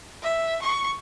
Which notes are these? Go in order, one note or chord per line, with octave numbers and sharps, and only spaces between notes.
E5
C#6